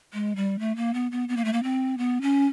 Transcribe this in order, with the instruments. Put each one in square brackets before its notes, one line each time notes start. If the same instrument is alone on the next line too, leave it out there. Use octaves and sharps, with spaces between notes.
[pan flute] G#3
G3
A3
A#3
B3
B3
B3
A#3
A3
A#3
C4
B3
C#4